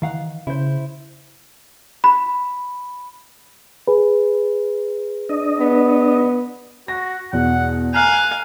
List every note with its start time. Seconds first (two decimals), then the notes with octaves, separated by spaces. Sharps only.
0.02 D#3 E3 F5 F#5
0.47 C#3 E4 C5
2.04 B5
3.88 G#4 B4
5.29 D4 D#5
5.59 B3
6.88 F#4 A#6
7.33 E2 B2 F#5
7.94 F5 G#5 A#5 F#6